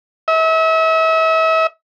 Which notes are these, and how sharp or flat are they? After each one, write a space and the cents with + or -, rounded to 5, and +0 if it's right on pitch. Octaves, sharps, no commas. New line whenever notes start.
E5 -40